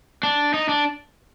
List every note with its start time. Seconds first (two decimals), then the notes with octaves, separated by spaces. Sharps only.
0.23 D4
0.54 D#4
0.69 D4